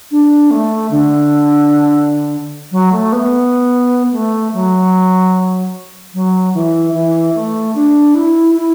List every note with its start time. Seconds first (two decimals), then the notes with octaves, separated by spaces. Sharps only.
0.11 D4
0.51 A3
0.91 D3
2.72 F#3
2.92 A3
3.13 B3
4.12 A3
4.54 F#3
6.14 F#3
6.54 E3
6.94 E3
7.35 A3
7.75 D4
8.15 E4
8.56 E4